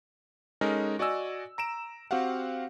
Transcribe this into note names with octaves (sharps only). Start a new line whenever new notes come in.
G#3 C#4 D#4 A4 A#4
F#4 D5 D#5 G#5 E6
A#5 D7 E7
C4 F#4 G4 F5 F#5